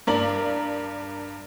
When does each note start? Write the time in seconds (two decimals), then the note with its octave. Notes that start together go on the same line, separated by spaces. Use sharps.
0.07 G2 A#4 D5 F#7